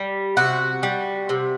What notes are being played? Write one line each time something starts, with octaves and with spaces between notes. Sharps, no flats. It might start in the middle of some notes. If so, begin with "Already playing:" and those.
Already playing: G3
C3 F#4
G3
C3